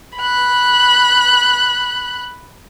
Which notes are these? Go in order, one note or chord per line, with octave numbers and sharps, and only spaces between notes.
B5 F#6